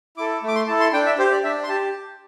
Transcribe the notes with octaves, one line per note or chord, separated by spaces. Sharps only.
E4 A4 D6
A3
D6
C6
E4 A4 A5
C6
D4 G5
E5
G4 C5
D5
D4 E5
C6
G4 A5